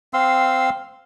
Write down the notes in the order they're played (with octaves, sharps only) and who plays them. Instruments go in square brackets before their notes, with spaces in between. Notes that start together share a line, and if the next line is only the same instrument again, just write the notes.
[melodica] C4 F5 C6 E6